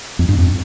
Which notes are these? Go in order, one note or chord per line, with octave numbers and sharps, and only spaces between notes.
F2
G2
F2